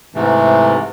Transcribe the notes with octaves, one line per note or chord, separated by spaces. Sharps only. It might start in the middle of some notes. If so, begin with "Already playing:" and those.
G#2 C3 E3 A3